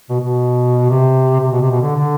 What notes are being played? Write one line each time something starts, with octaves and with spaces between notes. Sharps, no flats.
B2
B2
C3
C3
B2
C3
B2
D3
D3